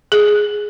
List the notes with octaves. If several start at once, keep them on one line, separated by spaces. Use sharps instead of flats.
G#4